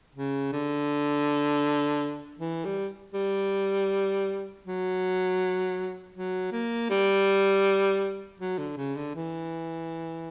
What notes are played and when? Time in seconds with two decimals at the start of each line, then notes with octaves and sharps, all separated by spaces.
0.15 C#3
0.52 D3
2.39 E3
2.65 G3
3.14 G3
4.65 F#3
6.15 F#3
6.52 A#3
6.90 G3
8.39 F#3
8.58 D3
8.77 C#3
8.96 D3
9.15 E3